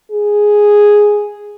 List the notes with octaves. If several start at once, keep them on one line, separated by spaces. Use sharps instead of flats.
G#4